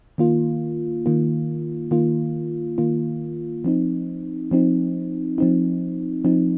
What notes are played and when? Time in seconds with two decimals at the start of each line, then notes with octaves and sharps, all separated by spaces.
0.18 D#3 A#3 F4
1.06 D#3 A#3 F4
1.91 D#3 A#3 F4
2.78 D#3 A#3 F4
3.64 F3 C4 D#4
4.51 F3 C4 D#4
5.38 F3 C4 D#4
6.25 F3 C4 D#4